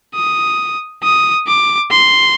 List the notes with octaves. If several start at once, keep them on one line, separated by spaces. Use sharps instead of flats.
D#6
D#6
D6
C6